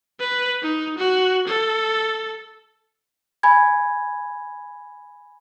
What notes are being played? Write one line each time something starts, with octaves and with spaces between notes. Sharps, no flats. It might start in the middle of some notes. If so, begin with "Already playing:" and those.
B4
D#4
F#4
A4
G#5 B5 G#6